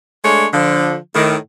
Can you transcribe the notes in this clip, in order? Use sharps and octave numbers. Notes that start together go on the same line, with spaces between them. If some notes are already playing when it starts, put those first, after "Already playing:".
G#3 A3 D4 C#5
D3 F3
A2 D#3